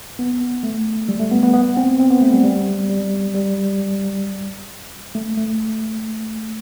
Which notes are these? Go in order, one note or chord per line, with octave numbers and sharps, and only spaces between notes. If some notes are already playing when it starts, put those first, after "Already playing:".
B3
A3
G3
A3
B3
B3
B3
C4
C4
B3
A3
G3
G3
G3
G3
A3
A3